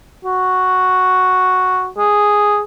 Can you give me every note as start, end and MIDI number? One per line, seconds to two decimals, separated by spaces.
0.25 1.88 66
1.98 2.61 68